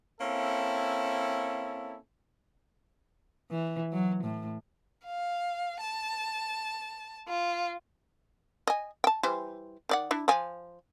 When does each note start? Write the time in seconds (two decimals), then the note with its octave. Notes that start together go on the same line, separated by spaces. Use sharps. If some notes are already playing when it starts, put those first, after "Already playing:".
0.20 A#3 C4 C#4 E4 A4
3.50 E3
3.92 F#3
4.23 A2
5.05 F5
5.80 A5
7.28 F4
8.67 D#5 G#5
9.04 G5 A5
9.23 E3 G3 C5
9.89 D#3 D5 F#5
10.11 D4 E4
10.28 F3 G#5